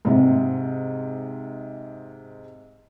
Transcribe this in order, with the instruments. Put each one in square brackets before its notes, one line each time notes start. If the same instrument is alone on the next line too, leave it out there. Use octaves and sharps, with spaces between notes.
[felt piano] G#2 C3